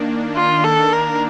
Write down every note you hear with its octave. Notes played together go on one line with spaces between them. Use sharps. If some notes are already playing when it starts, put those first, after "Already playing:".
Already playing: D#3 A#3 D4
F4
A4
A#4